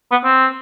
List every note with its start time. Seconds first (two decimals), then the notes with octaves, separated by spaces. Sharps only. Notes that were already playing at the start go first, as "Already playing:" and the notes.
0.11 B3
0.24 C4